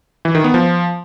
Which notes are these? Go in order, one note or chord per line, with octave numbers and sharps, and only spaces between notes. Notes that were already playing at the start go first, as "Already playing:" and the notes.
E3
D#3
B3
F3